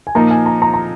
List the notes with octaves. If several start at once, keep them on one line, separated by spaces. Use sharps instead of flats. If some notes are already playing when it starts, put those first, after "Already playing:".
G#5
A#2 F3 A#3 D#4 A#5
G#5
A#5
A#5
A#5